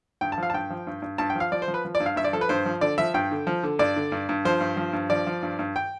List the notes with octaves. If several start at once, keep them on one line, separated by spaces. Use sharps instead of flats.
G2 G5
A5
F3 F5
A5
G2 G5
F3
G2
G2
G2 A5
G5
F3 F5
F3 D5
C5
F3
B4
F3
D5
G2
F5
G2 E5
D5
F3 A4
B4
G2 C5
F3
D3 D5
F3 E5
G2 G5
D3
F3
D3
G2 D5
D3
G2
G2
F3 C5
G2
F3
G2
F3 D5
F3
G2
G2
G5